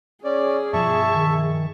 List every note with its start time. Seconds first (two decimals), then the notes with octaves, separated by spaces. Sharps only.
0.24 C#4 G#4 D5
0.73 G2 B2 F3 E5 A5 C#6
1.15 D#3